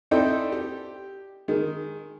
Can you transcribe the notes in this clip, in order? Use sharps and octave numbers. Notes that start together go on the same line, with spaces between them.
C4 D#4 E4 A4 D5 G5
G4
D#3 G#3